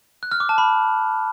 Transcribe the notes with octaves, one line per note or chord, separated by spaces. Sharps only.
F#6
F6
D6
A5
B5